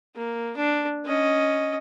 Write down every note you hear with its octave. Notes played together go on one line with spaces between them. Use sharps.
A#3
D4
C#4 D#5